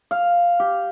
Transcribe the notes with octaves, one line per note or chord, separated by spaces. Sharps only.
F5
G4